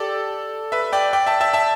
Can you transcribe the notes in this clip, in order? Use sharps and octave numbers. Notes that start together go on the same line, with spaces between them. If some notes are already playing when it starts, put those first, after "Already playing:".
Already playing: G4 A4 D5
B4 E5
D5 G5
D5 G5
E5 A5
E5 A5
E5 A5